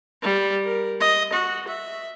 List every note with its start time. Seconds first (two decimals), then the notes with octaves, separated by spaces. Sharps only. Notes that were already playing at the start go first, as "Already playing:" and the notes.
0.23 G3
0.65 A#4
1.01 D#5
1.33 F#4
1.68 E5